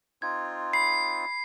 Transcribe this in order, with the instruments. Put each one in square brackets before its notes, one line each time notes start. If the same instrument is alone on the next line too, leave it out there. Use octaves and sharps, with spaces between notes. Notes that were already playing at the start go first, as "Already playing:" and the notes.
[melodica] C4 D#4 F4 [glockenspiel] G#6
[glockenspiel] B5 [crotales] C7